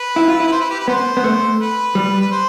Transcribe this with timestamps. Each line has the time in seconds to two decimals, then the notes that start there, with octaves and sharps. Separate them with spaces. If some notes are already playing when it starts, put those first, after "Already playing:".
Already playing: B4
0.16 E4
0.28 F4
0.40 E4
0.47 B4
0.52 C5
0.61 B4
0.70 G4
0.80 B4
0.88 B3 C5
1.17 B3
1.24 A3
1.60 B4
1.95 G3
2.21 B4
2.31 C5